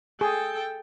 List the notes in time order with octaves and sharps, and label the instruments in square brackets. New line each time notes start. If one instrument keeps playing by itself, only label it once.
[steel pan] G#4 [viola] A4 G5